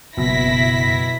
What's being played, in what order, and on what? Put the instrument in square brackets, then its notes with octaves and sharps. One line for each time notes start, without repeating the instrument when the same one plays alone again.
[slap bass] F#1 [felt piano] B2 [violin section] E4 A#6 B6